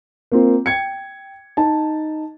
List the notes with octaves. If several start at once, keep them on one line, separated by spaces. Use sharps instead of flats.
A#3 C4 F4
G5 G#6 C#7
D#4 A5